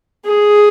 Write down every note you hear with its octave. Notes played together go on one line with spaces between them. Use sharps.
G#4